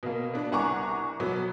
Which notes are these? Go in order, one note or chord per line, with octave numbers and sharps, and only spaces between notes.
B2 A#3
B3 D4
C2 F#5 G#5 A#5 C#6 D6
B2 F#3 B3